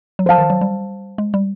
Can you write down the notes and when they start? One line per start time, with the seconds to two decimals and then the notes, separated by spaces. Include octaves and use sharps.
0.19 F#3
0.26 F3 C5 F5 A5
0.38 D#3
0.50 F#3
0.61 G3
1.18 G#3
1.34 G3